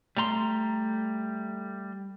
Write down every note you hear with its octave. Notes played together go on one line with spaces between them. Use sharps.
G3 A3 A#5 C6